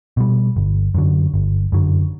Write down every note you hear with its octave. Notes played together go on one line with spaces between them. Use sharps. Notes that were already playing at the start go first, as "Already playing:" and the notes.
B2 G3
G1
F#2 D3 F#3
G1
F#2 D3 F#3